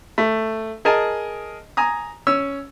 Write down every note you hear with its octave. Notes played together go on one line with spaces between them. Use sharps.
A3
G#4 A#4 D#5 G#5 A5
G#5 A#5 D#6
C#4 C#5 E6